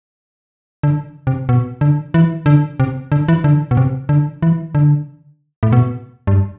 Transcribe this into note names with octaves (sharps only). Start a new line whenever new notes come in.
D3
C3
B2
D3
E3
D3
C3
D3
E3
D3
B2
C3
D3
E3
D3
A2
B2
G2